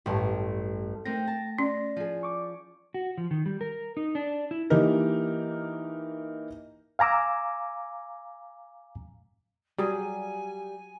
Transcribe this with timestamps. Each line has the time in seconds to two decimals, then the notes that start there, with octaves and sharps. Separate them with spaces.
0.06 A1 G2
1.05 A3 C4 D#4 A#4 G5 A#6
1.27 A5
1.59 C#4 D5
1.97 F3 G#4
2.23 C#6 D6
2.94 F#4
3.18 F3
3.31 D#3
3.46 G3
3.61 A#4
3.97 D#4
4.15 D4
4.51 E4
4.70 E3 A#3 D#4 G4 A#4
6.99 F5 G#5 A#5 D6 E6
9.78 F#3 G3 G#4 G#5